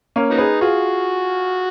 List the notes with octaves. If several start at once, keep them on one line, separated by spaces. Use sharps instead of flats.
A#3 C#4
F#3 B3 D#4
G#4 B4
F4 F#4 G#4